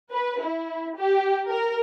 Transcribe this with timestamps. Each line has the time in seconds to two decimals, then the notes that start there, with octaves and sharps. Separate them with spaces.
0.12 B4
0.42 E4
0.98 G4
1.49 A#4